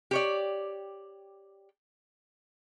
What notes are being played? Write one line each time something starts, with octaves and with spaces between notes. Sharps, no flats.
G4 C#5 D5